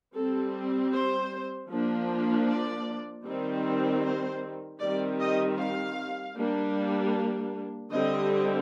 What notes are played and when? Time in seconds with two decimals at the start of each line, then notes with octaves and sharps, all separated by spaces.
0.15 G3 C4 A4
0.93 C5
1.70 F3 A#3 D4
2.47 D5
3.25 D#3 G3 C4
4.03 C5
4.80 D#3 G3 C4 D5
5.20 D#5
5.58 F5
6.35 G3 A#3 D4
7.91 D3 G3 C4 D#5